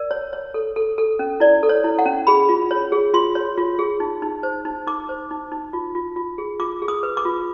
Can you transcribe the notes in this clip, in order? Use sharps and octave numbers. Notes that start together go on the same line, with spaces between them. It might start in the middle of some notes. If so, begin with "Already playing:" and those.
Already playing: A#4 D5
C#5
C#5
A4
A4
A4
C#4
E4 D5
A4
C#5
E4
F#5
C#4
G#4 B5
F4
C#5
G#4
F4 C6
C#5
F4
G#4
D#4
D#4
C5
D#4
D#4 D6
C5
D#4
D#4
F4
F4
F4
G#4
F4 D6
G#4
D#6
B4
D6
F4